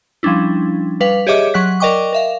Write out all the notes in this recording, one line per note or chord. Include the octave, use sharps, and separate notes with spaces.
F3 G3 C#4 D4 E4
G3 B4 F5 B6
G4 G#4 C#5 D#5 E5 D6
F#3 F#5 F#6 B6
A#4 D5 D#5 G5 C#6 D6
A#4 E5 F5